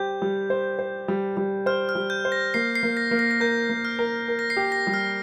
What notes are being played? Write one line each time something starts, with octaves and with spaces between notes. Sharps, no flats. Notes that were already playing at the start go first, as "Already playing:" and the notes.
Already playing: G3 G4 C5 G6
G3
C5
C5
G3
G3
C5 F6
F6
G3
G6
C5
A#6
A#3 C7
C7
A#3
A#6
A#3
A#6
A#6
A#4 G6
A#3
F6
A#4
A#4
A#6
C7
G4
A#6
G3
F6